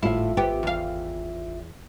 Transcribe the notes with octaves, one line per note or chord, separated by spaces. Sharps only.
G#1 A2 E4 F4 E5 F5
B3 G4 G5
E2 F5